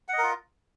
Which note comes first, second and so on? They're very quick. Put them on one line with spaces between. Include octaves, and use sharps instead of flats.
F#5 D#5 A#4 F4